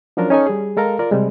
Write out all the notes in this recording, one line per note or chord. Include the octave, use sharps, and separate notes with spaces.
F3 F#3 C#4 D4 F4 A#4
C#4 D#4 A4 G#5
G3 G#4
G#3 A4 A#4 F5 A#5
F4 A#4 D5
C3 G3 G#3